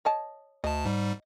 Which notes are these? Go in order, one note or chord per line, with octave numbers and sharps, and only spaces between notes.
C#5 D#5 A5
D2 D#5 A5
G#2 G3